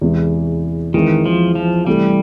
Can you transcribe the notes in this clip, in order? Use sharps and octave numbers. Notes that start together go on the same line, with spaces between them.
E2 C3 E3 G#3
D#3 E3 G#3 C4
F3
F3
C3 E3 G3 A3